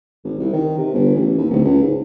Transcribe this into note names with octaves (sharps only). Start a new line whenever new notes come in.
G#1
C2
D#3
C3
G1
A1
D#2
D1
C#2
G#2